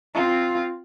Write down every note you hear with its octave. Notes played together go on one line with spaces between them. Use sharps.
C4 F4